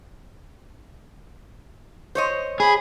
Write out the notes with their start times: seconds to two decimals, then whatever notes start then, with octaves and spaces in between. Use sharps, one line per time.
2.15 C5 C#5 D#5
2.60 G#4 B5